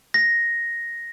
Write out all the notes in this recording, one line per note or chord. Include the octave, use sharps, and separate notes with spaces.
A#6